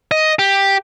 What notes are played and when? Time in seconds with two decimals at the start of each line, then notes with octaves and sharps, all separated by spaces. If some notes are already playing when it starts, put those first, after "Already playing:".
0.11 D#5
0.39 G4